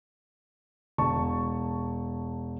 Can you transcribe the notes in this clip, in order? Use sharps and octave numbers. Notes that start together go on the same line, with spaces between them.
E1 A5 C#6